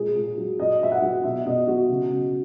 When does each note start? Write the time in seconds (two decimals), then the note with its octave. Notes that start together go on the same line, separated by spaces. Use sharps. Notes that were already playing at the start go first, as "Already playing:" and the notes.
Already playing: A#2 G#3 G#4
0.15 A#2
0.38 F#3
0.58 A#2 D#5
0.81 A#2 E5
0.91 F#5
1.02 F#3
1.24 B2 E5
1.46 B2 D#5
1.67 F#3 F#4
1.90 C#3
2.12 C#3